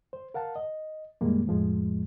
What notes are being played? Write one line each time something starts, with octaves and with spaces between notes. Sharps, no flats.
C5
A#4 F5 F#5 A5
D#5
F#2 A#2 D#3 G3 G#3 A#3
F2 A2 F3 G#3